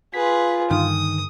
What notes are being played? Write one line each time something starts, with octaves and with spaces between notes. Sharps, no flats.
F4 G#4 B4 B6
G2 D3 D#3 D#6